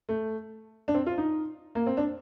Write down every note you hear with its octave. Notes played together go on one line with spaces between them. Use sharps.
A3
D4
C4
F4
D#4
A#3
C4
D4